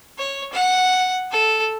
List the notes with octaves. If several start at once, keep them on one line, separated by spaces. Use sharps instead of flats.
C#5
F#5
A4